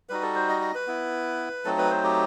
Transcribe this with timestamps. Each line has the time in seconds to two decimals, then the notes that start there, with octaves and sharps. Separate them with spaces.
0.09 G3 D#4 F#4 B4
0.22 A4
0.35 C5
0.49 D#5
0.61 D#5
0.75 B4
0.87 B3 E4
1.65 F#3 A3 C4 D#4 A4
1.78 B4
1.91 C5
2.04 G4